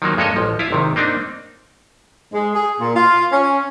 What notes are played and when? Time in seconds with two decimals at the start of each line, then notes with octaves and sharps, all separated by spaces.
0.02 D#3 F3 F#3 A#3
0.17 G2 G#3 A#3 A4 C#5 D#5
0.36 A1 F3
0.59 E4 F4 F5
0.71 G#1 C3 D#3
0.96 A#3 C4 D4 D#4
2.34 G#3
2.54 G#4
2.80 A#2
2.96 F4
3.32 C#4